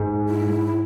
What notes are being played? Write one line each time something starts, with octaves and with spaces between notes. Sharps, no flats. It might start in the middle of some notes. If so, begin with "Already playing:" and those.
Already playing: G#2
E4